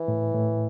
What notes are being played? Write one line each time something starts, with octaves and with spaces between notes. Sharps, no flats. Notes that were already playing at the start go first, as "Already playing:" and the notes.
Already playing: E3
A2
A2